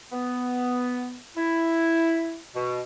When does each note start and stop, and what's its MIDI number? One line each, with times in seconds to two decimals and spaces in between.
0.12 1.17 59
1.37 2.39 64
2.54 2.80 47